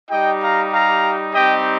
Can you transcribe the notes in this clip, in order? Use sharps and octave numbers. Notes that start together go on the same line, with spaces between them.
G3 D#4 G4 D#5 G5
F5 A#5
F5 A#5
G3 C4 D#4 G4 D#5 G5